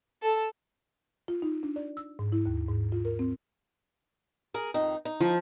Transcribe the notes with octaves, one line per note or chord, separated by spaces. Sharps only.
A4
F4
D#4
D4
D5
E6
G#2
E4
D#2
G#2
F4
A#4
C4
G#4 A#4
F2 D#3 D#4
D#4
F3